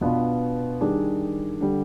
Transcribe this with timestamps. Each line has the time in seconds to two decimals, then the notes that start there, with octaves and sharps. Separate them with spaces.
0.01 B2 B3 D4 F4 B4
0.81 D#3 G3 D4 G#4
1.61 D3 G3